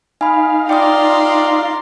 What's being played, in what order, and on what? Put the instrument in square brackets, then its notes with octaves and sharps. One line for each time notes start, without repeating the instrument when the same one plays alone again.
[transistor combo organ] D#4 F5 [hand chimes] G#5 B5
[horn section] D4 F4 D5 [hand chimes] G5 D#6 [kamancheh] A#5 C6